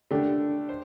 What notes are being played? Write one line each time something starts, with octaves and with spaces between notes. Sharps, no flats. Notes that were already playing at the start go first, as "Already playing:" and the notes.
D3 A3 D4 G4
C5